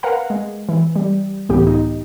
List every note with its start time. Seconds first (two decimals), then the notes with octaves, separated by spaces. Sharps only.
0.03 A#4 B4 F5 F#5 A#5
0.30 G#3
0.69 E3
0.96 G3
1.49 C#2 A2 E3 B3 G4
1.67 D#4